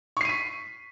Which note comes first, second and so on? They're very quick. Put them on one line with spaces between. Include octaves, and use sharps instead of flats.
C#6 C7 D#7 B6